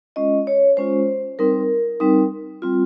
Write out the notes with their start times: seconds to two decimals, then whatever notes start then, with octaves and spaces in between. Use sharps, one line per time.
0.16 G#3 C#4 F4 D#5
0.47 C#5
0.77 G#3 C#4 F4 C5
1.39 G3 C4 D#4 A#4
2.00 G3 C4 D#4
2.62 G3 C4 F4